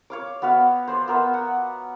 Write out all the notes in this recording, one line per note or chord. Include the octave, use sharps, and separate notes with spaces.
C#5 F5 D6
B3 F#4 E5 F5
C5 D5 C6
B3 A#4 E5
F#5